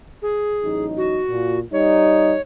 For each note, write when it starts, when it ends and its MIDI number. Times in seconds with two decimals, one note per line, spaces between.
0.22 0.85 68
0.64 1.21 33
0.64 1.21 54
0.64 1.21 63
0.97 1.59 66
1.28 1.62 46
1.73 2.34 55
1.73 2.34 63
1.73 2.41 73